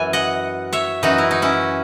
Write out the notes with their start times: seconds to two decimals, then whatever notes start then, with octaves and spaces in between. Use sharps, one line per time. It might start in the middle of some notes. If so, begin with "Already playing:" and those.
Already playing: F#2 E3 G#5
0.13 D#5 F#5
0.73 C#5 E5
1.03 F#2 E3 D#4 F#4
1.18 E4
1.31 D#4
1.42 C#4 E4